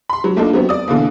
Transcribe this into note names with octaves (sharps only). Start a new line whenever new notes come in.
B5 C6
F#3
A3 A#3 D4 D#4 F4 A4
F#3 B3 C4
D5 D#6
B2 D3 E3 A#3